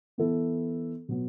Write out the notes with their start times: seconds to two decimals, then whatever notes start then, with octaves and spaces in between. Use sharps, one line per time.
0.18 E3 B3 E4 A4
1.08 B2 F#3 B3